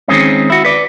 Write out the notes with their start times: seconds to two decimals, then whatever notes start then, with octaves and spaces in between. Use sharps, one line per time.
0.08 D#3 G#3 C4 C#4
0.50 E4 F#4
0.65 B4 D5